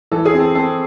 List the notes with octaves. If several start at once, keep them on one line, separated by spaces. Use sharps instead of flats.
E3 A4
G#4
C4
A4
C4 A4